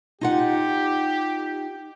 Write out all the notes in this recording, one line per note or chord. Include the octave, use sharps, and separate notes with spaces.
D#4 F4 G4 F#5